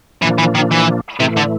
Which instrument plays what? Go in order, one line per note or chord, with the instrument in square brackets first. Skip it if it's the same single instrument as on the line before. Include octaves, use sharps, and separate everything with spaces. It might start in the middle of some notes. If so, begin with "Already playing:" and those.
[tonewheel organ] A#2 F3 A#3 D4 [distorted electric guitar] E3
[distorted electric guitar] E3
D#3
E3
[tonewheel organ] A2 E3 A3 [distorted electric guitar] C3
[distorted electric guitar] D3